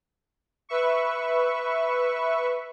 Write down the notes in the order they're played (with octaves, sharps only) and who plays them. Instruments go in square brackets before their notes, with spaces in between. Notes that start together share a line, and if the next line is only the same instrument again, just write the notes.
[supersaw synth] B4 E5 C#6